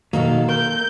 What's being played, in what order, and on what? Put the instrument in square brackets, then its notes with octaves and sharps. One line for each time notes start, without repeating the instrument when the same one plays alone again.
[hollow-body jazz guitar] B2 D#3 F#3 [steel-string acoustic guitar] A#3 A4
[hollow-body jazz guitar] A#4 [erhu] G6